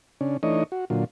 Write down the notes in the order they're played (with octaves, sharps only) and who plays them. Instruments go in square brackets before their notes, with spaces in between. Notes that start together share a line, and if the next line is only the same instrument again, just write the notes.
[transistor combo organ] C#3 C#4 D4
E3 A3 D4 D#4 C#5 D#5
F#4
A#2 D3 F#3 F4